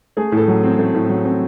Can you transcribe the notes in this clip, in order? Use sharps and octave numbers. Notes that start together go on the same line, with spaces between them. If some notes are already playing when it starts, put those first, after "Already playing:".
A3 G#4
A2
A4
F#3
C4
A3
A2
F#3
C4